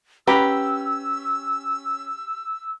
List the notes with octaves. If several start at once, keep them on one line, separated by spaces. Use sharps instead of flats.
C#4 G4 B4 A#5 B5 E6